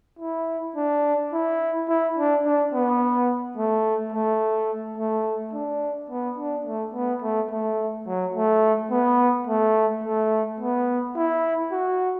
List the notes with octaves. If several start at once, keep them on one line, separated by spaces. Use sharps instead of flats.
E4
D4
E4
E4
D4
D4
B3
A3
A3
A3
D4
B3
D4
A3
B3
A3
A3
F#3
A3
B3
A3
A3
B3
E4
F#4